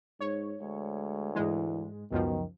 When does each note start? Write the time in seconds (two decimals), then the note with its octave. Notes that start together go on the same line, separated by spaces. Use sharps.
0.21 G#2 C#5
0.62 D2 G#3
1.35 G#2 E3 G#3
2.12 C#2 F#2 B2 D#3 F3